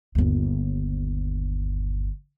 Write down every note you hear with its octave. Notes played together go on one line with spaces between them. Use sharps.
G1 D#2